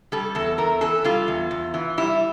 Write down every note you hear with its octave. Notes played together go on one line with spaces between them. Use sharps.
G3 A4
E2 A4
E2 A#4
E3 A4
G3 F4
E2
E2
E3
G3 E4